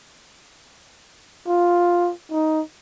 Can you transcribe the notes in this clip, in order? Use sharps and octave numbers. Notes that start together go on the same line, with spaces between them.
F4
D#4